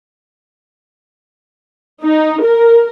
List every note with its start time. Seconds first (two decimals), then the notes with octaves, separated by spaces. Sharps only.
2.02 D#4
2.42 A#4